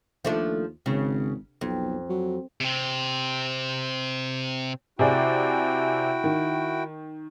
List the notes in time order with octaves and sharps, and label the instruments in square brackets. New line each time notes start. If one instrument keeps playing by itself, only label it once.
[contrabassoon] D#2 [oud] F3 A3 D4
[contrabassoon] G#1 [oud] C#3
[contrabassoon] B1 [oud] F2
[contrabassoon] F#3
[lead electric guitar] C3 C4
[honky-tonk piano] C3 G#4 D5 [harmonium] E4 F#4 G5
[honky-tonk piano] D#3